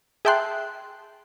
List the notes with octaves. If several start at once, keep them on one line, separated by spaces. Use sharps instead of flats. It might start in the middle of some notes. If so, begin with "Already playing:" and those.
G#4 E5 G5 A5 C6 F#6